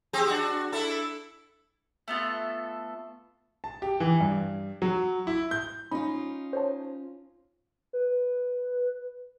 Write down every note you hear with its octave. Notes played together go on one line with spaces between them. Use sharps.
C4 G4 G#4
D4 F#4
D4 E4 A4
A3 B3 F4 A4
A5
G4
E3
G2
F#3
E4
G6
C#4 D#4 F4 B5
C5 C#5 A5
B4